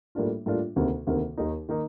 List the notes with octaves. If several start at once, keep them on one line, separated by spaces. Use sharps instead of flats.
A2 G3 A#3 D4 F4
A2 G3 A#3 D4 F4
D2 C3 D#3 A#3
D2 C3 D#3 A#3
D#2 D#3 A#3 D#4
D#3 A#3 D#4